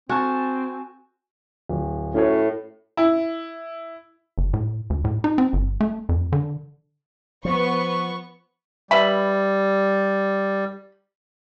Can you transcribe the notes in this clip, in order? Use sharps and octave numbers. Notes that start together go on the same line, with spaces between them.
C4 F#4 G#5 A5
D1
A2 C#4 F#4 C#5
E4
F#1
A2
D2
A2
D#4
C4
G1
A3
F2
D3
F3 B3 C#6
G3 B4 E5 B5